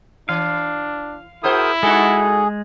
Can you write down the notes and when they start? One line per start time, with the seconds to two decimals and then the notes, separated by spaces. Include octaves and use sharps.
0.29 E3 D4 F5
1.44 E4 F#4 G#4 A#4 C5 D#6
1.83 G#3 D#4 F#4 G#4 A4